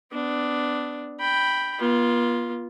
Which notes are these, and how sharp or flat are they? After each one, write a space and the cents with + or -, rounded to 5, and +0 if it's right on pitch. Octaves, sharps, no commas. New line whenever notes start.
B3 +25 D4 +0
G5 +0 B5 +0
B3 -45 F4 +0